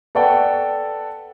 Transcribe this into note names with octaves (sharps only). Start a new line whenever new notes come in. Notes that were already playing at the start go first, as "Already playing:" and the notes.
A4 B4 D5 F#5 G5 A5